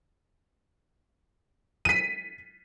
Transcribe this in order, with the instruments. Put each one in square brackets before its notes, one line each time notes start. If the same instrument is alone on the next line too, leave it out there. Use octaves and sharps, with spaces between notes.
[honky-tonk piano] B6 D#7